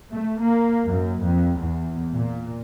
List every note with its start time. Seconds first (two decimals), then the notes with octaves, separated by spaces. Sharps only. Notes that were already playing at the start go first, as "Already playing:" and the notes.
0.10 A3
0.41 A#3
0.87 F#2
1.24 F2
1.61 E2
2.13 A#2